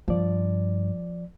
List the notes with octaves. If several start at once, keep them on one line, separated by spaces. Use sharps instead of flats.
G2 F3 D5